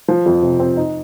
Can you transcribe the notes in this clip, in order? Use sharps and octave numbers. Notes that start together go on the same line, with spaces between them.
F3
F2
C3
C4
D#4